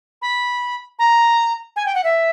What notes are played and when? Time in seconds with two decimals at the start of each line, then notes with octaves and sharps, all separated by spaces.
0.22 B5
0.99 A#5
1.76 G#5
1.86 G5
1.95 F#5
2.04 E5